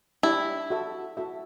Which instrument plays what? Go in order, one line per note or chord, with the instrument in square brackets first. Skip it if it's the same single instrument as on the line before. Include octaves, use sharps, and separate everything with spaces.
[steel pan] D4 G4 D5 [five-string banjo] E4
[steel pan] F#4 A4 E5
F#4 A4 E5